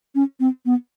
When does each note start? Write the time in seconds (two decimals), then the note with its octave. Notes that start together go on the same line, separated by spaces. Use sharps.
0.15 C#4
0.40 C4
0.66 B3